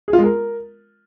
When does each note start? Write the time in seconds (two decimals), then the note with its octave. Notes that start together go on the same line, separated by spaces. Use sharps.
0.08 G#4
0.13 F4
0.18 G#3
0.24 A#4